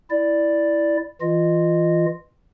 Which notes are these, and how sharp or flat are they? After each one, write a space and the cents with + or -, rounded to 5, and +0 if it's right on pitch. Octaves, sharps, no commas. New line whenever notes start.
E4 +0 D5 +0
E3 +0 F4 +0 D#5 -20